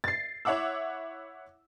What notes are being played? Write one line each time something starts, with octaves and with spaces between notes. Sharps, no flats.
A6 C7
E4 C#5 E5 F#5 D6 E6